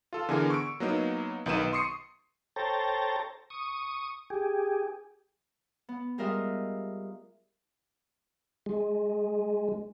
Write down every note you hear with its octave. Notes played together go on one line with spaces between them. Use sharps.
F4 A4
D3 E3 B3 G#4 A#4
C#6 E6 D7
F#3 A#3 B3 D#4
B1 D#3 B3 D#4 D#7 E7
C6 C#6 D#6 C7 C#7
A4 C5 C#5 G5 A5 A#5
C#6 D#6
G4 G#4
B3
G3 G#3 F4 A#4 D#5 E5
G#3